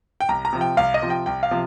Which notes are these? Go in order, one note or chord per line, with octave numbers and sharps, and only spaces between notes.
G5
C2 A#5
A#5
C3 F3
G5
C2 F5
D#5
C3 F3
G5
C2 G5
F5
C3 F3